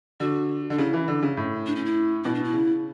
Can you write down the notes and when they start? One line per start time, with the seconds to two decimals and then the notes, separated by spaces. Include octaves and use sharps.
0.20 D3 F#4
0.70 D3 D4
0.78 C#3 E4
0.93 E3
1.08 D3
1.23 C#3
1.37 A2
1.66 D4
1.76 C#4
1.85 E4
2.24 B2 E4
2.35 D4
2.44 E4
2.53 C#3